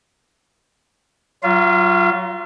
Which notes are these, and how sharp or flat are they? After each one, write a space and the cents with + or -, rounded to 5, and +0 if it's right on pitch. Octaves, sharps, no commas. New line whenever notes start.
F#3 +20 F4 +0 F5 -45